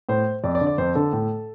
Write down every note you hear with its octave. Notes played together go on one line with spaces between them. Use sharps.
A2 C5
F2 D5
D5
D3
D5
F2 C5
D3 A4
A2